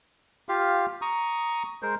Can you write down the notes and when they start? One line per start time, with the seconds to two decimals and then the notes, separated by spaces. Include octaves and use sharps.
0.49 F4 G4 F5
1.02 A#5 C#6 D#6
1.82 G#3 A#4 C5